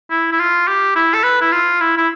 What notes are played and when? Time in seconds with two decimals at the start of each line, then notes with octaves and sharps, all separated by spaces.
0.11 E4
0.32 E4
0.39 F4
0.68 G4
0.96 E4
1.14 A4
1.24 B4
1.41 E4
1.52 F4
1.80 E4
1.97 E4